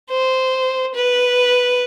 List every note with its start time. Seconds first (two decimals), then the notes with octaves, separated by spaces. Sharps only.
0.11 C5
0.95 B4